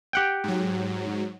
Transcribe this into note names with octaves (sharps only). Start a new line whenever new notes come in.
G4 F#5 G5
G#2 F#3